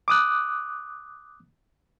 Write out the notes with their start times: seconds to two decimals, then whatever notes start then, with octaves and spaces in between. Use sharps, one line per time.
0.08 D6 D#6 F#6